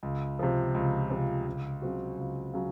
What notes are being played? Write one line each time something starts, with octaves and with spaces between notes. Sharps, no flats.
C#2
C3 F3
C#2
C3 F3
C#2
C#3 F#3 C4 F#4
C#2
C#3 F#3